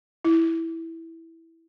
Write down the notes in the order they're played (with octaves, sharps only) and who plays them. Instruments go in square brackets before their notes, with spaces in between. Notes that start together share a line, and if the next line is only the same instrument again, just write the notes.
[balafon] E4